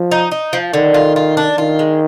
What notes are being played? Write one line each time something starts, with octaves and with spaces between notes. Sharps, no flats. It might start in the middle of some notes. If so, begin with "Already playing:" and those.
Already playing: F3
D#4
D#4
F3
D3 D#3
F4
F4
D4
D#3 F4
G#3